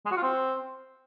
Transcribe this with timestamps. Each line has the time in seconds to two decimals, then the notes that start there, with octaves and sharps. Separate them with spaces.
0.06 G#3
0.11 F#4
0.17 F4
0.23 C4